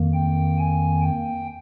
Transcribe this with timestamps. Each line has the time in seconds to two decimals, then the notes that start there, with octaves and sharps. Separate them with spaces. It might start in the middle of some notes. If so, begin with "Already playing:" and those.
Already playing: F2 D#3 A#3
0.14 G5
0.58 G#5
1.02 G5